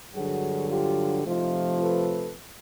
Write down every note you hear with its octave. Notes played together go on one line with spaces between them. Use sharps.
G2 D3 F#3 F#4 G#4
F4 G4
C3 F3 A3 D#4 F4
A4 B4